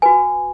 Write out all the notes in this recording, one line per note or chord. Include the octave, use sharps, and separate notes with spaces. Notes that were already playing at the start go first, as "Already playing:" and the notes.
F#4 B4 G#5